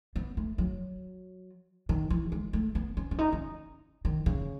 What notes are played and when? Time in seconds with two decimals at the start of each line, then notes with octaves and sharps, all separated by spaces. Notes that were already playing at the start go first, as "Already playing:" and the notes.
0.16 B3
0.37 A3
0.58 F#3
1.89 D#3
2.10 E3
2.32 G#3
2.53 A3
2.75 B3
2.97 C#4
3.11 C#4
3.19 D#4
3.32 C#4
4.05 D#3
4.26 C#3